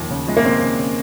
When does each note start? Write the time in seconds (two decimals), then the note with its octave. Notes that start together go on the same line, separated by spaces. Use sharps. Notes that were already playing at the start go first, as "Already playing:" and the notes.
Already playing: D#2 F3
0.10 C#3
0.27 F3 G#3
0.37 A#3
0.44 D#2 C4
0.61 C#3
0.79 C#3